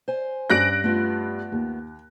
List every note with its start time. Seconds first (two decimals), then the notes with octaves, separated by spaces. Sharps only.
0.08 C5 G#5
0.50 G2 C#4 F#6 A#6 D7
0.84 A3 B3 F4
1.52 D#2